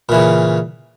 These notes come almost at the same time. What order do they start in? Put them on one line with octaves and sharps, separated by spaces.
A#2 E3 C#3